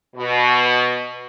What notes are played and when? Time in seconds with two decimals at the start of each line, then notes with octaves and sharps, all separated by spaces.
0.16 B2